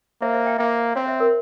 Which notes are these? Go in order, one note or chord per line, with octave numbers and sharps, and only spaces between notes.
A#3 C5 E5
C5 E5
E5 G5
A#3 E5 G5
C4 C#5 F5
C5 E5
A#4 C#5